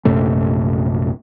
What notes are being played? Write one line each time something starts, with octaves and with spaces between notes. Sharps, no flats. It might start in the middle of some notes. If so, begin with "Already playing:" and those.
A#1 F#2 C3 A3